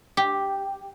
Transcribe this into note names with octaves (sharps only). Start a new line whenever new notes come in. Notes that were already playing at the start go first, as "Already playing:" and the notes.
G4